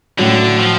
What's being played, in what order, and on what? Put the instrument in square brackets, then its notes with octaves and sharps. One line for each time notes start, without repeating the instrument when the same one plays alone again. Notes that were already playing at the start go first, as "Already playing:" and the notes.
[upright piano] A2 F#3 C#4 [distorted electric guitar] D3
[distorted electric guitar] F3